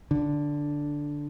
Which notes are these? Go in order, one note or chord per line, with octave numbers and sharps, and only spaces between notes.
D3